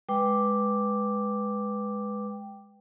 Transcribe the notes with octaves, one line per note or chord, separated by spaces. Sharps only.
G#3 B4 G5 D6